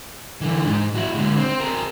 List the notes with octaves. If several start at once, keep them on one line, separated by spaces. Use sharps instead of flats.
D3 E3
G#2 G#3
E4 F#4
D3 G#3
C4
G#4 A#4